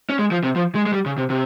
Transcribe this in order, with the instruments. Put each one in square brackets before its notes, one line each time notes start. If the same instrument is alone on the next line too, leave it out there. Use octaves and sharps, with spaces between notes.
[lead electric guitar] C#4
G#3
F3
C3
F3
G#3
G#3
G3
C#3
C3
C3